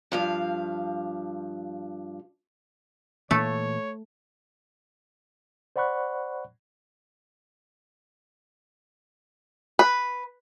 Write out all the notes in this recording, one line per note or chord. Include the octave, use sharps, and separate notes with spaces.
G2 F3 F5
A#2 E3 A3 A#3 C#5
C5 D5 F#5 B5 C#6 F#6
B4